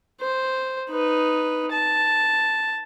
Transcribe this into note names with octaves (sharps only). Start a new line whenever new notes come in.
C5
D#4 B4
A5